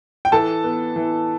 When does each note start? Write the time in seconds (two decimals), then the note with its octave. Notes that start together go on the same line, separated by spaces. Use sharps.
0.25 G5
0.32 E3 A4 A5
0.64 B3
0.96 E3